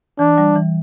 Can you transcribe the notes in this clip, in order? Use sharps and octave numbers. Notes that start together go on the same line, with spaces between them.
E3 D4
G3
E3